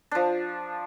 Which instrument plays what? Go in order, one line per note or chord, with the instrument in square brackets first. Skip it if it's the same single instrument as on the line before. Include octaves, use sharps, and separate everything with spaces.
[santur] F3 D4